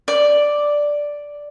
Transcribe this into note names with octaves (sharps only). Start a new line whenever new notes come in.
D5